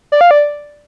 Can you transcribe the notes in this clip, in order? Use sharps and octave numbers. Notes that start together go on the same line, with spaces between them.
D5
F5
D5